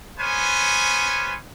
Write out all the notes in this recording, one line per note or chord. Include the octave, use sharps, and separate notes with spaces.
B3 C#4 C5 G#5